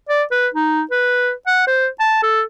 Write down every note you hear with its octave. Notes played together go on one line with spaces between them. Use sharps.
D5
B4
D#4
B4
F#5
C5
A5
A4